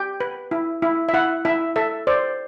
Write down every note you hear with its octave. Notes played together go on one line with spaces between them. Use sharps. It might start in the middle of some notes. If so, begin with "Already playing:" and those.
Already playing: G4 G5
B4
E4
E4
E5
E4 F#5
E4 E5
A4 E5
C5 D5